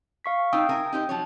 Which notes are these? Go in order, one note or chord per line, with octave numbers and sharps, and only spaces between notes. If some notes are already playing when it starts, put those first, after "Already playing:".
F5 C#6 B6
D#4 F4 C5 G5 D#6 E6
A#4 E5 G#5
D#4 G4 C5
F3 F#3 C#5